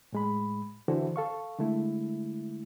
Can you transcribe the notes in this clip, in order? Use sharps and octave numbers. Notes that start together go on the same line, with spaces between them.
A2 G#3 B5
D3 E3 E4 F#4 A4 C5
A4 F5 C#6
D3 G#3 A3 E4